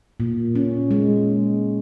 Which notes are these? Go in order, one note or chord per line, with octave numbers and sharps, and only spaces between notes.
A#2
C#4
G#3